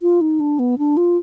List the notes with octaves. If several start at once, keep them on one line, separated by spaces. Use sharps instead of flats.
F4
D#4
D4
B3
D4
F4